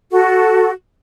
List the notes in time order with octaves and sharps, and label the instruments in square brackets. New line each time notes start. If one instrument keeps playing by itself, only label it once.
[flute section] F#4 A4